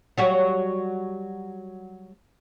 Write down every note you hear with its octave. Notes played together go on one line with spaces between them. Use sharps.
F#3 G3 F#4